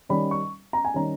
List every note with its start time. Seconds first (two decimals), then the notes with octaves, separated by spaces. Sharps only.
0.09 D#3 G3 C#4 B5
0.31 C#6
0.73 A#5
0.85 G#5
0.94 D#3 G3 C#4 A#5